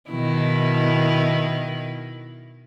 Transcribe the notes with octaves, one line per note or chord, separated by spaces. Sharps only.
B2 D#3 E4